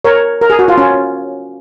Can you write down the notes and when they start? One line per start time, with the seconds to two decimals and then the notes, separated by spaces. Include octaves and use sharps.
0.05 A#4 C#5
0.42 A#4
0.50 G#4
0.59 F#4
0.68 F4
0.78 C#4